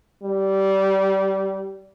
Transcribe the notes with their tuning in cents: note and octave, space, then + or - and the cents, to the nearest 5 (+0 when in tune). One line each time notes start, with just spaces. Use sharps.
G3 -20